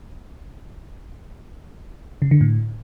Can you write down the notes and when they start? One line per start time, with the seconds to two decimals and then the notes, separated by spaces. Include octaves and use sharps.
2.22 C#3
2.31 D3
2.41 A2